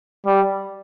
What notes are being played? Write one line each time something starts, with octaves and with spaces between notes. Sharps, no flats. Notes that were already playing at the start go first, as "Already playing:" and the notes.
G3